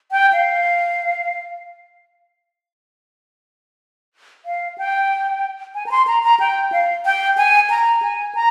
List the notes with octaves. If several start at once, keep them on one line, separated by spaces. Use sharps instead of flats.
G5
F5
F5
G5
G#5
A#5
C6
A#5
A#5
G5
F5
G5
G#5
A#5
G#5
A#5